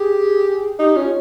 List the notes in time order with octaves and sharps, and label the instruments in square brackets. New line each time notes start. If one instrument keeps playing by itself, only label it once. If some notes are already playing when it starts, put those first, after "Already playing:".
Already playing: [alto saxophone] G4 [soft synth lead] G#4
[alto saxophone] D#4 [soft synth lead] G4
[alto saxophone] C#4 [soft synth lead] F4